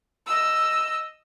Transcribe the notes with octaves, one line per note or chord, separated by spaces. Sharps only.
D#5 E6